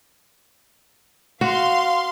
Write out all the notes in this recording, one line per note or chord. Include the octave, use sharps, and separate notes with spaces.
F#4 F5 C6